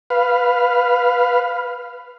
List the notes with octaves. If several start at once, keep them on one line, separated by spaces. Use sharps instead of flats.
B4 F5